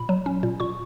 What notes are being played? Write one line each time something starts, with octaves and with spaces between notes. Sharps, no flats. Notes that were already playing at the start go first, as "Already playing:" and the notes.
Already playing: A#2 B5
F#3
C#4
A#2
A#2 C#6